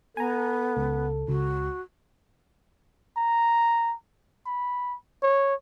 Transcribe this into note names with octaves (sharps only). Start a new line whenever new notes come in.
B3 A4 G#5 A#5
C#2
C#2 F#4
A#5
B5
C#5